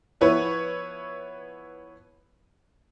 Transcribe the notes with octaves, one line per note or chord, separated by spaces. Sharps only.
F3 B3 E4 B4 C#5